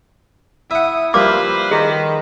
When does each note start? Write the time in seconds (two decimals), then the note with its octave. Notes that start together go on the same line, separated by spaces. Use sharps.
0.71 E4 E5 F#5 D#6
1.14 F3 G3 A#3 B4 C5 D6
1.71 D#3 G#4